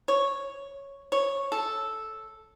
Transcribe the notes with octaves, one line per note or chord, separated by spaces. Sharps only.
C#5
C#5
A4